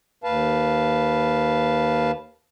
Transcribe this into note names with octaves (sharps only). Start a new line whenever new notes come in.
D#2 B4 F5 A5